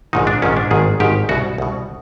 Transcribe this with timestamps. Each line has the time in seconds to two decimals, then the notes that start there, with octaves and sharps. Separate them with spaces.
0.13 A#1 G#2 D#3 D#4
0.27 D4
0.42 A#1 G#2 D#3 C#4
0.57 D4
0.71 G#1 G#2 D#3 G#4
1.00 G#1 G#2 D#3 G4
1.29 C2 B2 F#4
1.58 C2 B2